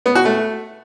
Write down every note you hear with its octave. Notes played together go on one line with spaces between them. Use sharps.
B3
F#4
A3